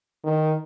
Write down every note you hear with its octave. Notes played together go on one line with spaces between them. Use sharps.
D#3